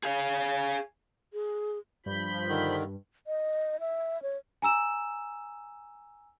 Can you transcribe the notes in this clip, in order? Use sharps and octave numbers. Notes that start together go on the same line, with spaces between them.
G#4 F5
G#4
G2 F3 B5 G6
D3 D#3
D#5
E5
C#5
G#5 A#5 E6 E7